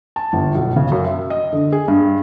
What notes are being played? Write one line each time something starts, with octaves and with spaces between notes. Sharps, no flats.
A5
G1
B1
C#3
F#2
E5
D#5
D3
G#4
G2